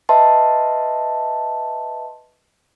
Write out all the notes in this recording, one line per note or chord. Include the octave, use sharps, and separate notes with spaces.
B4 D#5 E5 A5 C6